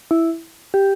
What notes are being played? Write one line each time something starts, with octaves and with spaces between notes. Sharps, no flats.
E4
G4